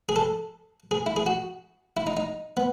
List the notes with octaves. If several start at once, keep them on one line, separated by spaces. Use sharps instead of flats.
G#4
A4
G#4
E4
G#4
F#4
E4
D#4
D#4
B3